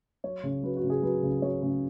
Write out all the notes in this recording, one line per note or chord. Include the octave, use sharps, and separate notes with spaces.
F#3 C#5
C#3
F#3 B4
F#4
C#3
G#4
F#3 B4
C#3
F#3 C#5
C#3